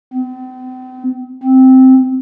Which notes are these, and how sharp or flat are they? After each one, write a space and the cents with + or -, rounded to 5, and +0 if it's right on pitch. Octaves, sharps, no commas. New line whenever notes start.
C4 -40
C4 -5